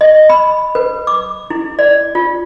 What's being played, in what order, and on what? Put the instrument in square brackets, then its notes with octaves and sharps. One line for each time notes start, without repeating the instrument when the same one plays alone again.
[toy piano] D#5
B5
B4
D6
E4
D5
F4